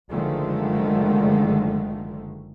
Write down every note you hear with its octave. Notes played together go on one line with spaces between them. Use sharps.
F#1 D3 D#3 F3 G#3 A3